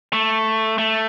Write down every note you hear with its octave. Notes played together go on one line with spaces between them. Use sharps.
A3
A3